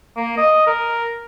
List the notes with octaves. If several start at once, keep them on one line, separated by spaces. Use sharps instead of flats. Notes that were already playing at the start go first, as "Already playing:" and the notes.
A#3
D#5
A#4